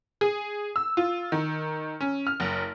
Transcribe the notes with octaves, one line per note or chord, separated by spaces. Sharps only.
G#4
E6
F4
D#3
C#4
F6
F#1